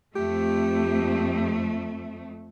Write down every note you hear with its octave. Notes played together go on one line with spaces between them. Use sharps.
F2 A3 G4